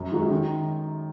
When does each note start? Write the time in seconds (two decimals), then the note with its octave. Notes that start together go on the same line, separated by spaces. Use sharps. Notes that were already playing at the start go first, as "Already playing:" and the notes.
Already playing: F#2
0.12 D#3 G#3 D#4 F#4
0.31 D#3